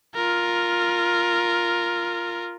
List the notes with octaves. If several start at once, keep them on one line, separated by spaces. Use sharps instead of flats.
F4 A#4